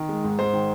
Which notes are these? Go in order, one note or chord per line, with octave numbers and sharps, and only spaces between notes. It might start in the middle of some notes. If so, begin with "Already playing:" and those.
Already playing: D#3
G#3
G#2
G#2 C5
D#3